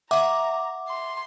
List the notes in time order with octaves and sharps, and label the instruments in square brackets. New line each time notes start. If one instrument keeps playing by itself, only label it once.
[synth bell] E5 F#5 D6 [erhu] A#5
[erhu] C6